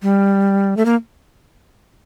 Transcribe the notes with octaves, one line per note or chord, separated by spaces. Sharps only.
G3
A3
A#3